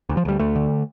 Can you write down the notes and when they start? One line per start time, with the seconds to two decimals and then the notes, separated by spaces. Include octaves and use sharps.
0.09 D2
0.17 F3
0.25 D2 G3
0.39 D2 A3
0.56 D3